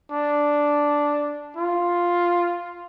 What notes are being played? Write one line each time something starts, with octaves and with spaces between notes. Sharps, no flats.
D4
F4